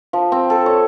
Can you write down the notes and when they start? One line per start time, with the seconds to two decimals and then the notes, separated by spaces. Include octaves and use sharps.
0.13 F3
0.32 C4
0.50 A4
0.66 C#5